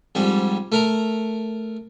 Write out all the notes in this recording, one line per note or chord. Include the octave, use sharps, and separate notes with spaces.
F2 G#2 G3
A3 A#4 A#5